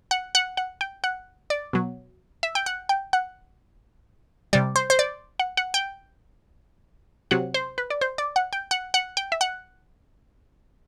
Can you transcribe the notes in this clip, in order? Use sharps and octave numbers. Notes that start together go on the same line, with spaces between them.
F#5
F#5
F#5
G5
F#5
D5
B2 F#3
E5
G5
F#5
G5
F#5
C3 G3 D5
C5
C5
D5
F#5
F#5
G5
C3 F#3 F#5
C5
B4
D5
C5
D5
F#5
G5
F#5
F#5
G5
E5
F#5